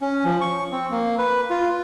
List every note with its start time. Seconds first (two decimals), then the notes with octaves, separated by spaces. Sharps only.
0.01 C#4
0.25 F3
0.41 C#6
0.72 C4
0.91 A#3
1.18 B4
1.50 F4